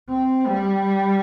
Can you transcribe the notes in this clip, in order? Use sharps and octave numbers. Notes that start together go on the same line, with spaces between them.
C4
G3